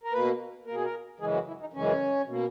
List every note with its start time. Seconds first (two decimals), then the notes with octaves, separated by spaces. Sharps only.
0.03 A#4
0.13 B2 A#3 B4
0.66 B2 A#3 A#4
0.75 G#4
0.84 A#4
1.20 F#2 C#3 E3 G#3 G#4
1.34 F#4
1.47 E4
1.60 D#4
1.73 F#2 C#3 E3 G#3 C#4
2.26 B2 A#3